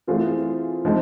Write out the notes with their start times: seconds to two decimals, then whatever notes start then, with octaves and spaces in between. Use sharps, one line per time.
0.07 E3 A3 C4 F4 G#4
0.85 F3 G#3 C4 D#4